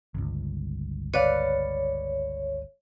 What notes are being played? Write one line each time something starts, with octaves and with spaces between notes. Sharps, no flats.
G1 C#2
B4 C#5 D5 F5